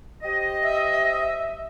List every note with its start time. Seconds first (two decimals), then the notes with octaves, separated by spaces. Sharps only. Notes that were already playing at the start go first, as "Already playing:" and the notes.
0.23 G4 C5 D#5
0.63 E5